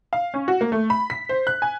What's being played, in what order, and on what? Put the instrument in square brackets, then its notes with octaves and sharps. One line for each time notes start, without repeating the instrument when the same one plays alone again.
[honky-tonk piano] F5
C#4
F#4
A#3
A3
B5
B6
C5
F#6
G#5